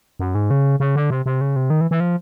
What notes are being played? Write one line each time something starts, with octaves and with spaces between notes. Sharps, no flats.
F#2
G#2
C#3
C#3
D3
C3
C3
C#3
C3
D#3
E3
E3
F3